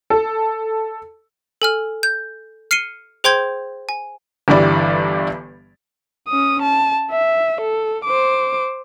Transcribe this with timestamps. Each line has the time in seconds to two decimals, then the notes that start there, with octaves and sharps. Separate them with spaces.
0.10 A4
1.62 A4 G#5 F6
2.03 G6
2.71 F6 C7 C#7 D#7 G7
3.24 G#4 C5 G5 C6 G6 G#6
3.89 G#5
4.48 G1 G2 E3 G3 D5
6.28 C#4 D#6
6.62 A5
7.11 E5
7.61 A4
8.05 C5 D6